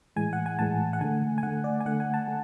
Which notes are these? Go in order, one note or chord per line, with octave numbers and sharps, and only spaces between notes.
A2 E3 G#3 G#5
F#5
G#5
A2 E3 G#3 A5
F#5
D3 A3 G#5
G#5
D3 A3 F#5
D5
G#5
D3 A3 F#5
G#5
A5
A3